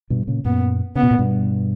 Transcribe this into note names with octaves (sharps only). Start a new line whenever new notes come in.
G2 B2
A#2 C#3
F#2 A#2 B3
C#3 B3
B2
A#2
G2 B2